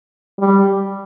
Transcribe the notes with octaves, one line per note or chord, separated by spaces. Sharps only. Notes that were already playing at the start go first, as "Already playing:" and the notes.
G3